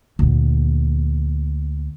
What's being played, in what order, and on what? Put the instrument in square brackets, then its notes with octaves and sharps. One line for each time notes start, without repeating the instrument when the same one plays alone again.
[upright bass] D2 A#2